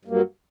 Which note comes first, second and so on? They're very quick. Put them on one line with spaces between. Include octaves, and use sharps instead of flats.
G2 A#3 F#3